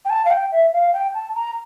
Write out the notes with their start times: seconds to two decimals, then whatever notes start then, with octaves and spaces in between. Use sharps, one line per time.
0.05 G5
0.10 A5
0.25 F5
0.30 G5
0.52 E5
0.73 F5
0.93 G5
1.14 A5
1.35 A#5